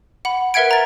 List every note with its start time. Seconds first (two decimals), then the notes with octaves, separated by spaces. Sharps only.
0.25 F#5 B5
0.54 A#4 B4 E5 F#5 G#6 D7
0.71 A#5 A6